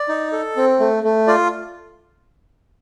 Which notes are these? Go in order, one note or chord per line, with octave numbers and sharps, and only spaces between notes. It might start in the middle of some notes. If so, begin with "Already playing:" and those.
Already playing: D5
D#4
A4
C4
A3
A3
F4 D5